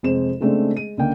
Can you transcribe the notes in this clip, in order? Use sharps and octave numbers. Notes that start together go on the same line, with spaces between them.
F1 F2 G#3 C5 E7
C#3 G#3 A3 C4 D4
G#3 D#7
C#2 D3 A#3 G5